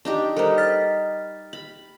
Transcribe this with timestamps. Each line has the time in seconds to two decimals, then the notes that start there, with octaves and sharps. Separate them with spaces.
0.05 D4 D#4 G4
0.36 G3 D#4 A4 A#4 C5
0.58 F6 A6 B6
1.53 B5